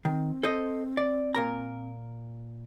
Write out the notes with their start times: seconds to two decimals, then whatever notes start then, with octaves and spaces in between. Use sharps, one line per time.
0.05 D#3 C4
0.43 A4 C5 D#5
0.97 D5
1.35 A#2 A#4 A#5